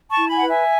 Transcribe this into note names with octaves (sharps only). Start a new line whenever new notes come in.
A5 C#6
E4
G#5 B5
B4 F#5
E5 G#5